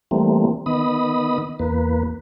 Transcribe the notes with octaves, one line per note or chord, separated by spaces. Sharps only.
E3 G3 A3 A#3 C4
D#3 B3 D#5 B5 D#6
E2 A#3 B4